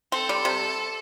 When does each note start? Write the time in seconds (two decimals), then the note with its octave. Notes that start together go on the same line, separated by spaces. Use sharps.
0.12 C4 A4
0.29 G3
0.45 C3